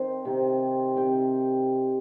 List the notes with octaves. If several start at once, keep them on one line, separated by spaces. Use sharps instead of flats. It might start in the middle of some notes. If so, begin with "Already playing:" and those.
Already playing: D#3 C4 A#4 C5
C3 D#3 C4
C3 D#3 C4 G5